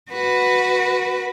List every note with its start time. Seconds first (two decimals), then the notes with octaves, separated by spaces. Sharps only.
0.11 F#4 B4